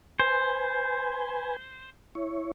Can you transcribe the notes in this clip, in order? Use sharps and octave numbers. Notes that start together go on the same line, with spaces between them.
B4 C5 G#5
E4 C#5